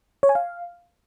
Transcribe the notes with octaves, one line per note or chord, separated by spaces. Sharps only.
C#5
G#5
F5